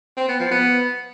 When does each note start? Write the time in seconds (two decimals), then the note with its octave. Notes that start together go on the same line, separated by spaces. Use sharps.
0.17 C4
0.29 B3
0.40 F3
0.51 B3